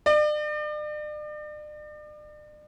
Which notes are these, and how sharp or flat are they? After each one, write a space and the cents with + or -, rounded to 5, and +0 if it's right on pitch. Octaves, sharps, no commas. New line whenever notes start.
D5 +40